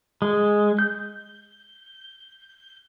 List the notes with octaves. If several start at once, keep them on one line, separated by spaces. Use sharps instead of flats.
G#3
G6